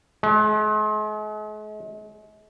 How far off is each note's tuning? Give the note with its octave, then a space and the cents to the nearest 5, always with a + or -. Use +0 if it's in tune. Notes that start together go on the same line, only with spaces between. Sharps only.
G#3 +45